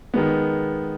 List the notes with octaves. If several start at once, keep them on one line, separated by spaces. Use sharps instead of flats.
D#3 G#3 B3